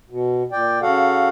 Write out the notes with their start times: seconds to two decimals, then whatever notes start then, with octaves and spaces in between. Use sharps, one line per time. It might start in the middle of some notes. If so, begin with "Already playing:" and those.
0.10 B2
0.52 A#2 D5 G5
0.82 C#3 F#4 A4 F5 F#5